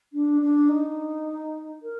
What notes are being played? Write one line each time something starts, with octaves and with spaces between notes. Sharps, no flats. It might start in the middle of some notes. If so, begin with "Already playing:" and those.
D4
D4
D#4
A#4